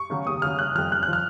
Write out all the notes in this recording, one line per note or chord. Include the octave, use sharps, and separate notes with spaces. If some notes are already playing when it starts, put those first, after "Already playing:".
Already playing: C#6
C#3 F#3
D#2 D#6
C#3 F#3 F6
F#1 F#6
F2 F3 F6
F#1 F#6
F#6
F3
F6